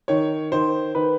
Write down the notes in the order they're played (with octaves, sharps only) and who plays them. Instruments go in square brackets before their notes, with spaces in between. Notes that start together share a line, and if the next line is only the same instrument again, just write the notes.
[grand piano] D#3 C#5
D#3 C5
D#3 B4